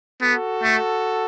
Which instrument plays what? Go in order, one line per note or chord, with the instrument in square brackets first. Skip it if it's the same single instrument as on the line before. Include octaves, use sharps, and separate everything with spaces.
[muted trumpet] B3 [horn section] F#4 A4
[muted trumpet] A3